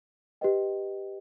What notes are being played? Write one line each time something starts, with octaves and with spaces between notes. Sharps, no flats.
G4 B4 D#5 G5